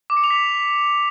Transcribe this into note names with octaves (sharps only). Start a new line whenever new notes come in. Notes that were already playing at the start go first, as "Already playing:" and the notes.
D6
C#7
F7
B6